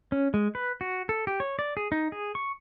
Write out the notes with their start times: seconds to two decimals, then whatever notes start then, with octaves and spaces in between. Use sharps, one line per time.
0.12 C#4
0.34 G#3
0.55 B4
0.81 F#4
1.09 A4
1.27 G4
1.40 C#5
1.59 D5
1.77 G#4
1.92 D#4
2.12 G#4
2.35 C#6